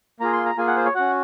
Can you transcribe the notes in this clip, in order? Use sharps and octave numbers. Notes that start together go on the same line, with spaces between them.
A#3 F4 G#4 A#5
C6
A#5
A#3 F4 G#4 G#5
F#5
C5
C#5
C#4 F#4 F#5